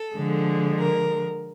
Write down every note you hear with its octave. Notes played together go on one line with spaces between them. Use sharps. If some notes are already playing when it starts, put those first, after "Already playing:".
Already playing: A4
D3 F3 G#3
A#4